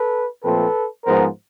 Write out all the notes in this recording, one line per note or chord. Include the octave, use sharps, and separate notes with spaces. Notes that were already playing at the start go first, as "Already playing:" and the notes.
Already playing: A4 B4
A#2 F3 A3 C4 A4 B4
G#2 F3 G#3 B3 A#4 C5